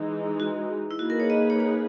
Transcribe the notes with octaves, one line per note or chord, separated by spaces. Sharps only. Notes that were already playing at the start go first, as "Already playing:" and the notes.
Already playing: E3 G#3 D#4
F#4
E4
A#3 D#4 F#4 G#4 B4
A#4
C#5
D#5
C#5
C#5